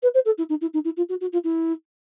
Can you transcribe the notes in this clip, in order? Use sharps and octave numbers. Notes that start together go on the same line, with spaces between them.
B4
C5
A4
E4
D#4
E4
D#4
E4
F4
F#4
F#4
F4
E4